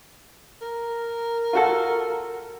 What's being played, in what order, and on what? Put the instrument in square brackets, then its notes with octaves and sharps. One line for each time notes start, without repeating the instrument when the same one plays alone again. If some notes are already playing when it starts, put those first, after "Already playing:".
[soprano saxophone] A#4
[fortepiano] F4 F#4 A4